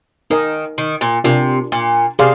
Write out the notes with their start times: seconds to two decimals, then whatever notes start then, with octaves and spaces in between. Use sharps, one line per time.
0.30 D#3 D#4 A#4 D#5 G#5
0.78 D#3
1.01 A#2
1.24 C3 D4 F4 A#4 D5 G#5
1.72 A#2
2.19 C3 G#4 D5 F5 C6